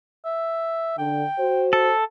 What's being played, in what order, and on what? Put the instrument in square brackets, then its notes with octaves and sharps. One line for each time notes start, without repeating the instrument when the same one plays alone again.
[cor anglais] E5
[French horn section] D3 [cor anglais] G5
[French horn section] F#4 C5
[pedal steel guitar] A4